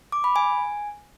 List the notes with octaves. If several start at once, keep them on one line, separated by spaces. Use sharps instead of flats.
D6
B5
G#5